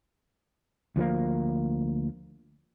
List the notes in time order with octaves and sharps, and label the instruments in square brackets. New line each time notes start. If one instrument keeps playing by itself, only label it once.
[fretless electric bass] D2 F3 F#3 A#3